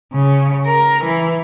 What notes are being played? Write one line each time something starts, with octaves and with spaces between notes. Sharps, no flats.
C#3
A#4
E3